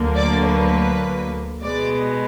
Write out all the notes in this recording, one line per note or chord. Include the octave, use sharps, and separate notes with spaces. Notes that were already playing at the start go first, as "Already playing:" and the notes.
Already playing: D2 D3 F#3 A#3
D5
B4
B2 G#3 B3 D5